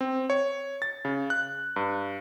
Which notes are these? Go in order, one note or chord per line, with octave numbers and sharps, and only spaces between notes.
C4
C#5
A6
C#3
F#6
G2